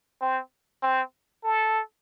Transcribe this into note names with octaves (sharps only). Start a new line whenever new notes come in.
C4
C4
A4